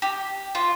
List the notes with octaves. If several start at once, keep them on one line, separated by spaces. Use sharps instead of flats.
G4
F4